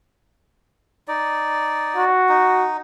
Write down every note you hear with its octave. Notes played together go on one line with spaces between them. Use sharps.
D#4 D5
F#4
D#4